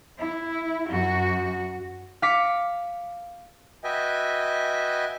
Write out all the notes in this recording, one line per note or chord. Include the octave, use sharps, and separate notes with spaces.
E4
F#2 F#4
F5 D6 B6 C#7
F#4 B4 D#5 E5 G5 G#5